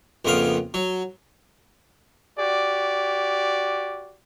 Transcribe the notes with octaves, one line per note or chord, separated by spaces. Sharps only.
A#1 F2 C#3 B3 F5
F#3
F#4 G4 D5